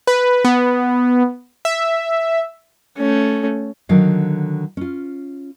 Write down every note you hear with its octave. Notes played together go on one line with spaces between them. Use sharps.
B4
B3
E5
A3 C#4
D3 D#3 F#3 F5
C#4 F4